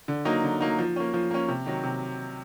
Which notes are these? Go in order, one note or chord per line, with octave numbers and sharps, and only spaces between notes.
D3
F#3 A#3 D#4
D3
F#3 A#3 D#4
F3
A#3 C#4
F3
A#3 C#4
C3
D#3 F#3
C3